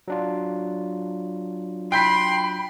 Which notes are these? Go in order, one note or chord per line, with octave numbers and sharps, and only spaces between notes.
F#3 D4 F4
G5 B5 C6 G6 B6